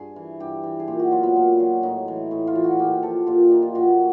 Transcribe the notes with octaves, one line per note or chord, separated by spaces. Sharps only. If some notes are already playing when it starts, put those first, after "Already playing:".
Already playing: G2 G#4
E3
G2 G4
E3
G#4
A#2 G4
F#4
F#3 F4
B3
A#2
F#3
A2 D#4
E3
A2 E4
F4
E3
F#4
A#2 G4
F3 A4
A#2 F4
F3 D#4
F4
A#2 F#4